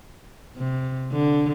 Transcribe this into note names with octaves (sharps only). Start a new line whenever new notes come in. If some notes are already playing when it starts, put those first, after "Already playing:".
C3
D3